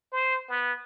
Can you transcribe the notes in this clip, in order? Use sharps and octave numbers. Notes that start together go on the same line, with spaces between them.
C5
B3